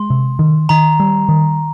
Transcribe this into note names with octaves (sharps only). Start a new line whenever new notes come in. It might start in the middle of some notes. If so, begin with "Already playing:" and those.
Already playing: G#3 C6
C3
D#3
D#3 A#5
G3
D#3